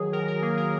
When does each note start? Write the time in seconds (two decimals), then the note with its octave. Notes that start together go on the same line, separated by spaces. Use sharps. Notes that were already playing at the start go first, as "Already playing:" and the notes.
Already playing: D#3 F#3 G#4
0.13 D#3 A#4
0.28 A#4
0.42 A#3 G#4
0.57 A#4